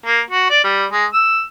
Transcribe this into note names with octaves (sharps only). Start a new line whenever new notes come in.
A#3
F#4
D5
G3
G#3
E6